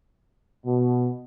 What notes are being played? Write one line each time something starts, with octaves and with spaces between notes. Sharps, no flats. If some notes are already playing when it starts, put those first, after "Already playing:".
B2